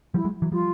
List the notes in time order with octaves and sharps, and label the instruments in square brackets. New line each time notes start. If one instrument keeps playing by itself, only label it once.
[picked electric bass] F3 G3 [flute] E4
[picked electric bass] F#3 G#3
E3 F#3
[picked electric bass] F3 G3 [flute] F4